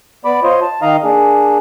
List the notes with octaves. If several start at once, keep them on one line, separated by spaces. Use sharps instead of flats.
B3 D5 B5 D6
F4 C5 C#5 D#5
A5
D#3 D#4 D#5 F5 A#5
A#3 D4 G#4